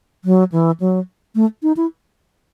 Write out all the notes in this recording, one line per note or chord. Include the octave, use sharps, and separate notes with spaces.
F#3
E3
F#3
A3
D#4
E4